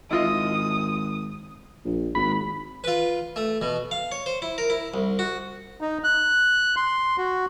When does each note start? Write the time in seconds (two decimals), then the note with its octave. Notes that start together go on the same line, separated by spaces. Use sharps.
0.10 G#1 E4 F4 D#5 D#6
1.85 A#1
2.15 G#1 B5
2.84 F4 B4
3.36 A3
3.61 B2
3.91 F5
4.12 C#5
4.26 C5
4.42 E4
4.58 A#4
4.70 E4
4.94 C2
5.19 F#4
5.81 D#4
6.04 F#6
6.76 C6
7.18 F#4